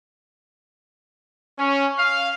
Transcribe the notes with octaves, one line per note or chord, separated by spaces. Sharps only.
C#4
F5